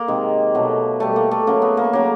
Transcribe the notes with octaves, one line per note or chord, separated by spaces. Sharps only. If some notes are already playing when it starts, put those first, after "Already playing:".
Already playing: A#3
C3 D#3 G#3
B2 F#3 A3
B2 G3 A3
A#3
A3
C#3 F#3 A3 A#3
B3
A#3
C#3 F#3 A3 A#3